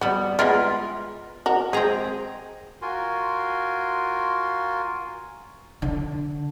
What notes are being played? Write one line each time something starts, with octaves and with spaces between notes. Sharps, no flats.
G3 B3 F#4
G#3 B3 E4 F4 A#4
F#4 A#4
G#3 C4 G#4 A#5
F4 F#4 A#4 G#5 C6
D3